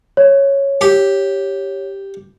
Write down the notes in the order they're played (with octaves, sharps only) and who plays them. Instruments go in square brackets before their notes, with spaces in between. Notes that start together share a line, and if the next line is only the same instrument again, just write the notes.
[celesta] C#5
[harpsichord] G4